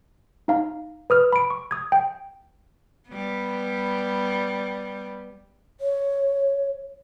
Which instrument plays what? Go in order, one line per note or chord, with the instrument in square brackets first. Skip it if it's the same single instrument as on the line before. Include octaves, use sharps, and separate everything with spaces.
[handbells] D#4 F5 A#5
B4 D#6 F6
B5 D7
C#6
D#6 G#6
G5
[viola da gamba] G3 B3
[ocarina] C#5